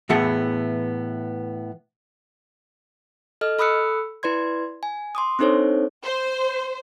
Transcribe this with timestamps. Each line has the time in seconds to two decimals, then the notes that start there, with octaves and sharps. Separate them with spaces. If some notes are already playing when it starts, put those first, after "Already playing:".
0.09 A2 E3 B3 G#4 F#5 A5
3.41 A4 D#5 F6
3.59 A4 B5 D#6 E6 F#6 C#7
4.23 E4 B4 D5 C6 G#6
4.83 G#5
5.15 C6 D6 D#6
5.39 C4 D4 D#4 A4 C5 C#5
6.04 C5